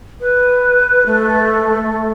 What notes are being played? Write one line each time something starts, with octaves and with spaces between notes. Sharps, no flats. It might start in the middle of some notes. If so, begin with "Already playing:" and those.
B4
A3